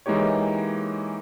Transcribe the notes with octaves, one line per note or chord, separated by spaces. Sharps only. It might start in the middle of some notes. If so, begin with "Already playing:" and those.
E3 G#3 A#3 D#4 G4 C#5